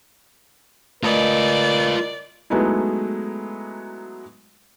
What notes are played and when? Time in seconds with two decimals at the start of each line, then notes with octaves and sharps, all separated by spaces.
1.03 A3 F4 A#4 B4 D5 D#5
2.50 F#3 G#3 A3 B3 D#4 E4